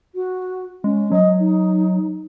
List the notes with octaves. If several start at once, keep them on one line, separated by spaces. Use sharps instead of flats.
F#4
G#3 C#4
F#3 D#5
D#4